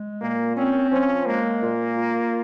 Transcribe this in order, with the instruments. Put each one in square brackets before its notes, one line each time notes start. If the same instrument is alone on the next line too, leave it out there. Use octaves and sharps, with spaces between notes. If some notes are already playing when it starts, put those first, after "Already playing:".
Already playing: [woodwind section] G#3
[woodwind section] A#2 [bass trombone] A#3
[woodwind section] C4 [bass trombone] C#4
[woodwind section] F3 [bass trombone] C#4
[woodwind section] G#3 [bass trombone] A#3
[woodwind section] A#2
F4